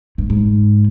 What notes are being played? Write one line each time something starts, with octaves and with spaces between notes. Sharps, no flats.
G2
G#2